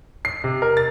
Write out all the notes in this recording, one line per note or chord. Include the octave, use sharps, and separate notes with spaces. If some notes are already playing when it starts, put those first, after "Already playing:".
C7
C3
A#4
A6